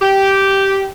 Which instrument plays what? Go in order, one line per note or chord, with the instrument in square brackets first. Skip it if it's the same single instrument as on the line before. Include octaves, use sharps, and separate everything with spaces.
[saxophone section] G4